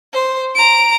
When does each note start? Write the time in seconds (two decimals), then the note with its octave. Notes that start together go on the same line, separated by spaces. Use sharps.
0.13 C5
0.55 A#5 D7